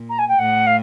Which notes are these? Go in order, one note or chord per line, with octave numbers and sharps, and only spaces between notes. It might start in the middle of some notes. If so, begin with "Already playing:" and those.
Already playing: A#2
A#5
G#5
G5
A2 F#5
F5